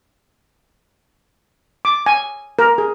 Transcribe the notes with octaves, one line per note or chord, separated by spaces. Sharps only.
D6
G#5
A#4
G#4